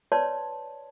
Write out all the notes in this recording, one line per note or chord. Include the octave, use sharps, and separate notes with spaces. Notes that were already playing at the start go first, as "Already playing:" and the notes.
B4 C#5 D5 A5 C6